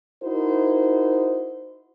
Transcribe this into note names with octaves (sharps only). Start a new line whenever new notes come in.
D#4 E4 F#4 A#4 C5